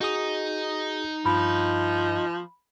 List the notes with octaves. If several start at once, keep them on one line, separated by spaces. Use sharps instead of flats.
D#4 F#4 G#4 D#6
G2 F3 B5